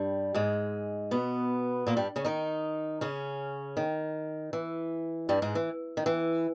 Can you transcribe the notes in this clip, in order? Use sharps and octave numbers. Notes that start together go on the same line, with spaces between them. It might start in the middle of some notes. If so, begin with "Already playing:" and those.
Already playing: G2 G3
G#2 G#3
B2 B3
A#2 A#3
G2 G3
C#3 C#4
D#3 D#4
C#3 C#4
D#3
E3
G2 G3
G#2 G#3
E3
D#3
E3